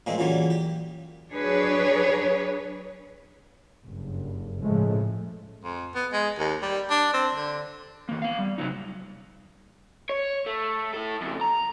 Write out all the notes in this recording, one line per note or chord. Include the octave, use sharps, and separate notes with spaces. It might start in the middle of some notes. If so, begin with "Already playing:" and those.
A#2 F3 G#3 A3 C4
A#2 C#3 E3 F#3 G3
G4
F#3 D4 G#4 B4 C#5
F#1 G2
A2 C#3 F3 G#3 A3
F2
B3
G#3
D#2
G3
D4
C4
D3
E3 A#3
B3 F5
G3
C3 D#3 F#3 D#4
C#5
A3
E4 A4
F2 C#3
A#5